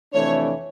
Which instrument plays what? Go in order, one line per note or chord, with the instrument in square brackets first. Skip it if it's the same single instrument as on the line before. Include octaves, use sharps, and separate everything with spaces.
[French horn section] F2 C3 E3 A3 D4 [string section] C#5